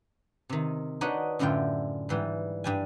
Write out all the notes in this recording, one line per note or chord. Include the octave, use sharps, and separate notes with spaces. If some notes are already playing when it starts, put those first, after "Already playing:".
C3 D#3
D4 D#4 F#4 B4 C#5 D#5
F#2 A2 D3 E4 F4 G5
G#2 E3 G3
G2 G3 G#5